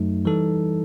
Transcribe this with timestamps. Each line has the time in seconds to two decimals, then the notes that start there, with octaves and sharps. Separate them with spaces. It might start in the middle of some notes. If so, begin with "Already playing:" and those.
Already playing: F#2 F#3 A3 D#4
0.25 E3 G3 D#4 A4